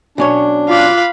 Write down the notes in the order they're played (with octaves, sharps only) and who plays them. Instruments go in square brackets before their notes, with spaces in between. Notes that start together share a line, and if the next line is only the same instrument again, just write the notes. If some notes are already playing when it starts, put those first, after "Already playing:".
[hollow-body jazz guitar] B1 C#4 C#5 [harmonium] D4
[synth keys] F4 D6 F#6 [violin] F5 B5